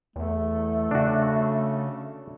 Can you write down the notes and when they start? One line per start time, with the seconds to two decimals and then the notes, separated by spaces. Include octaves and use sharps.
0.16 E2 A3
0.91 C#3 D4 F#4